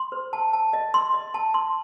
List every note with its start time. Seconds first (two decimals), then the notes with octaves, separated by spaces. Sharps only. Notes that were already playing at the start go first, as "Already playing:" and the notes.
Already playing: C6
0.12 C5
0.33 A5
0.53 A5
0.73 D#5
0.94 C6
1.14 D#5
1.34 A5
1.54 C6